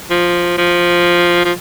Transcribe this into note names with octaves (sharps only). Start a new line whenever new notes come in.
F3
F3
F3